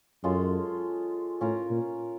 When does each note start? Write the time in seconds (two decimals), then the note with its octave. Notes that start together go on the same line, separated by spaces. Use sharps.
0.24 F#2 G#3 C#4 F4 A4
1.41 A2 C#4 F4 A#4
1.70 A#2